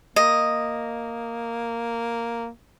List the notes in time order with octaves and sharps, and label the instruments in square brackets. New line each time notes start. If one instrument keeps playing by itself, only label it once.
[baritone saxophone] A#3 [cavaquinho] D#5